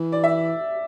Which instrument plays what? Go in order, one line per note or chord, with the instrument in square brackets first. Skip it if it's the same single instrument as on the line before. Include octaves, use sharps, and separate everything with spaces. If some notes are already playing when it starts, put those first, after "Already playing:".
Already playing: [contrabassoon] E3
[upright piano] D5
E5